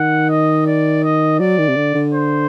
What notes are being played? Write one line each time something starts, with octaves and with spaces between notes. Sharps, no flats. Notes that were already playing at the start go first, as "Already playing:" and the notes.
Already playing: D#3 F#5
D#5
D5
D#5
F#3 D5
D#3
C3
D3
D3
C5